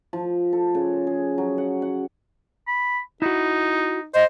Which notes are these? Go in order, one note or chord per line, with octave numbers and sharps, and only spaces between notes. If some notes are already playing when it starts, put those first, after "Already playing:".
F3
A4
C#3
G#4
F#3
F#5
F#5
B5
D#4 E4 F#4
C5 D#5